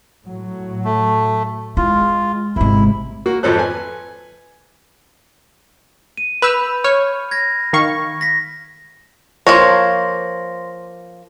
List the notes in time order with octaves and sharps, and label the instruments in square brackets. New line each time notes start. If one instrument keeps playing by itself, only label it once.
[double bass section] A2 F#3
[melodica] A3
[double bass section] G#3 [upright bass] E4 [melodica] F4
[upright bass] G#1 G#3 [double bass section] C3 [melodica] E4
[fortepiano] A#3 F#4
G#1 F2 F3 A4 C5 F#6
B4 G#5
[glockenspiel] D#7
[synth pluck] B4 E6 [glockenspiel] B5 G6 F7
[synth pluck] C#5 [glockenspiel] F6
[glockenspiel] G#6 A#6
[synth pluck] D#3 F5 C#6
[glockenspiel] A#6 B6
[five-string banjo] F3 A#3 C#5 [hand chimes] C6 A#6